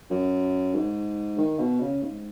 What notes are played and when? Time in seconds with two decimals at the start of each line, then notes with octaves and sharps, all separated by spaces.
0.10 F#2
0.75 G#2
1.38 D#3
1.59 B2
1.81 C#3
2.03 G#2